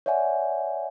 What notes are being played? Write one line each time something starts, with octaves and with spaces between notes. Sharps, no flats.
C#5 D5 E5 F#5 G#5